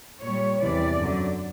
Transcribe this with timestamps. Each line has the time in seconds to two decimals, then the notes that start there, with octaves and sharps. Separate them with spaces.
0.22 A#2 G3 C#5
0.60 E2 C3 E3 G3 D5
0.99 F#2 D3 F#3